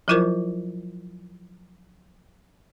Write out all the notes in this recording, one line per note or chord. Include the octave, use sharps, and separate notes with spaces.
F3 F#3 E4 F4 A#4 C5